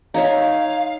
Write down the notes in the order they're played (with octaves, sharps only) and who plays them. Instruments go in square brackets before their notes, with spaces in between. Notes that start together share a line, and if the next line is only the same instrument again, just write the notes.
[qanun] D#4 C#5 E5 [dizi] F5